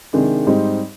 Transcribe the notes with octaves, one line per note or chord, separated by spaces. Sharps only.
C3 D#3 G#3 D4
G#2 G3 C4 D#4 G4